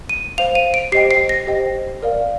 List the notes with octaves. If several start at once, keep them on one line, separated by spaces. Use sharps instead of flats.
D#7
C5 F5 F7
D#7
D7
G4 C5 D#5 G5 C7
C7
A#6
G4 C5 D#5 G5
A#4 D5 F5